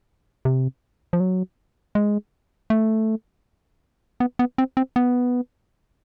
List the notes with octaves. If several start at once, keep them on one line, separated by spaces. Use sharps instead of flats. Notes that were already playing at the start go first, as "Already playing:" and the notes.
C3
F3
F#3
G#3
A3
B3
B3
C4
C4
B3